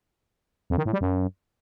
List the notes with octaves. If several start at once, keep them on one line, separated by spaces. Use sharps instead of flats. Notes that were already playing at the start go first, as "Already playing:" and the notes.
F2
D#3
A2
G3
F#2